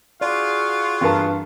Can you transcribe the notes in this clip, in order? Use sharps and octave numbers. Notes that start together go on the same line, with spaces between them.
F4 F#4 G#4 D5 F5
G2 E3 A#4 B4 A5